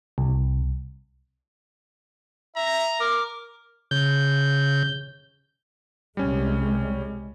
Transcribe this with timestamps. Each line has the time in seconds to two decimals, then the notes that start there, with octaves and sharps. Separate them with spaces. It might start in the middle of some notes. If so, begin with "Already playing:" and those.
0.18 C2
2.56 E5 A#5
3.00 A#4 D6
3.91 C#3 G6
6.17 C2 G3 G#3 C#4